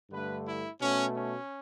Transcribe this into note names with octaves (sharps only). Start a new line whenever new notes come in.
G2 D3 A3 B4
E4
B2 A3 C#4
C#4